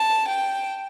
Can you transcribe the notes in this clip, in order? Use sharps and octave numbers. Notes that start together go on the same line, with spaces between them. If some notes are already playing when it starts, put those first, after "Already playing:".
Already playing: A5
G5